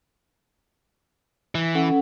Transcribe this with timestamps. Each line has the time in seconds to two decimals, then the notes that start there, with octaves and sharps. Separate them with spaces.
1.55 E3
1.75 C#4 A4 F#5